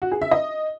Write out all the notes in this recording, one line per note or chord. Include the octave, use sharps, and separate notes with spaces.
F#4
G#4
E5
D#5